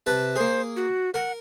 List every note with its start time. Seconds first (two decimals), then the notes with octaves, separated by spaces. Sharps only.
0.06 C3 B4 A5
0.36 A#3 G#4 C5
0.76 F#4
1.14 A#4 F#5